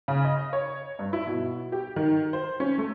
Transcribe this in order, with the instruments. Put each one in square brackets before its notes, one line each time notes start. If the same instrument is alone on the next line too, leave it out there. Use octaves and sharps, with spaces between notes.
[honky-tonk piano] C#3
D#5
C#5
G2
E4
B2
G4
D#3
C5
C#4
A3